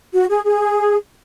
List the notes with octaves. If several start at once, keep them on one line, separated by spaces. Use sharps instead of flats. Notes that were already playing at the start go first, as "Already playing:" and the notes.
F#4
G#4
G#4